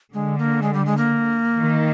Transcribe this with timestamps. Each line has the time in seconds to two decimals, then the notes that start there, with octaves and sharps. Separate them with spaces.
0.14 D3 G#3
0.39 A#3
0.62 G#3
0.74 G3
0.86 G#3
0.97 A#3
1.58 D#3